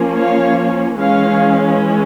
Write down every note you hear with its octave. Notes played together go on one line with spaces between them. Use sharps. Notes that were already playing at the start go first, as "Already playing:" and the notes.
Already playing: F3 A#3 C#4
C#5 F5
E3 G#3 C#4 C#5 F5